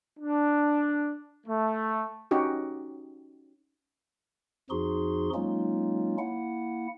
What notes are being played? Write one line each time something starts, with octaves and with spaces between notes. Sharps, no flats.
D4
A3
C#4 D#4 F#4 G4
F2 F3 D#4 F#4 G#4 C6
F#3 G#3 A#3 C#4 D#4 F4
A#3 E4 F#5